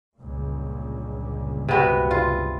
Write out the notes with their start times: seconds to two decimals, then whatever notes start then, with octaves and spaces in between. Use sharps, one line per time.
0.18 G1 C#2 A#2
1.69 C3 B3 F#4
2.11 F4